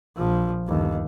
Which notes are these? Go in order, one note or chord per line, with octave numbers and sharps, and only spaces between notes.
A#1 F3
G1 D#2